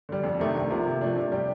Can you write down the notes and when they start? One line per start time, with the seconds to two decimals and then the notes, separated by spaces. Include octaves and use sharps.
0.09 D3 G3
0.24 F2
0.39 C3 D#3 A3 D4
0.55 C2
0.70 C3 F3 A#3
0.86 C3
1.01 F3 A3 D4
1.16 C3
1.32 G3 D4 G4